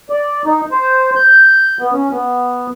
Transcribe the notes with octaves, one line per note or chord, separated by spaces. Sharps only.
D5
D#4
C5
G6
B3
C#4
B3